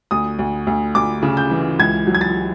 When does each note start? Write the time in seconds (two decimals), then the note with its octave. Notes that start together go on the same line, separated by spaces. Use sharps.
0.11 D2 D#6
0.39 D2
0.67 D2
0.95 D2 D6
1.23 C#3
1.37 G6
1.51 E3
1.79 C#2 G#6
2.07 F#3
2.14 G#6
2.21 A6